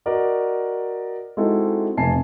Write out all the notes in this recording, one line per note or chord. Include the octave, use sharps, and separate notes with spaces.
F#4 A#4 D5 D#5
G#3 C4 D#4 E4 F#4 A4
F1 F2 G#5 A5 C7